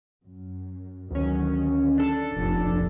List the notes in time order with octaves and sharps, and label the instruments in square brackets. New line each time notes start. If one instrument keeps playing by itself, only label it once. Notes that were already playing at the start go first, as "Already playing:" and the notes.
[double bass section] F#2
[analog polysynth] D2 C#4 [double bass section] D#3 F#3
[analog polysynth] D4 A4
[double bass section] F1 A#1